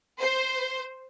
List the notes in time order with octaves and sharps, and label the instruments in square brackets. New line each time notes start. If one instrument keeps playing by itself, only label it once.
[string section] C5